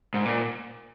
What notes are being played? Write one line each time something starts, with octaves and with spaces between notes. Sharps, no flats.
G#2
A#2